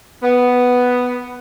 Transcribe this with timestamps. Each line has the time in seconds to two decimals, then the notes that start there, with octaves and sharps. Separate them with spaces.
0.22 B3